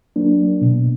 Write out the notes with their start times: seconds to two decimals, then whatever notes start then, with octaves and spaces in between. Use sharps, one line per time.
0.16 F#3 A#3 D4
0.62 B2